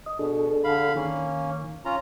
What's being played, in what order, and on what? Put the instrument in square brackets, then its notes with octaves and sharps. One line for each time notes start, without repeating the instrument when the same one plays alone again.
[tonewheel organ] D#5
[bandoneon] B2 [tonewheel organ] D4 G#4 A4
[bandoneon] D3 F5 B5
[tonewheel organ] D#3 [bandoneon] A#3 C#4
[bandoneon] C#4 F4 A#5